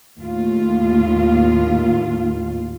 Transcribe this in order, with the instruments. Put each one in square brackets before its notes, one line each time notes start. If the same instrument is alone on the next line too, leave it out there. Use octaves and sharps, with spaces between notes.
[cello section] D#2 A2 F4